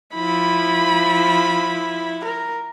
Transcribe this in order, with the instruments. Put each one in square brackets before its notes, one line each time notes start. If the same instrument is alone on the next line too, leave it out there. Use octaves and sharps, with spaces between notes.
[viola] F3 B5 [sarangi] E4
[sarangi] A#4